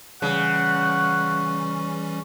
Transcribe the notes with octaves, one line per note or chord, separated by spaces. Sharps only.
C#3 E3 G3 C#4 F#5